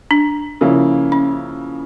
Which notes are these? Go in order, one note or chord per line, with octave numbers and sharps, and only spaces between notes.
D4
C#3 F3 A#3 E4
C#4